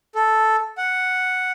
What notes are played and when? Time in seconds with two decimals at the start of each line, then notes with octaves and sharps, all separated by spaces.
0.15 A4
0.77 F#5